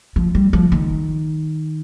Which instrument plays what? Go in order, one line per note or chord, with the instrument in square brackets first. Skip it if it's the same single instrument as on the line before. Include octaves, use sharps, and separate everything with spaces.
[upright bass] F3
G3
F3
D#3